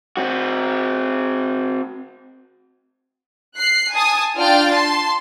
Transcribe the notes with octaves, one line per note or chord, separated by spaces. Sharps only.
C4 F#4
F#6 C7
G#5 A5 D#6
D4 F4 G5 F6 A6
A5 C6